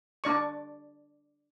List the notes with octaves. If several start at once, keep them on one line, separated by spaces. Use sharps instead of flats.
D4 D5 C#6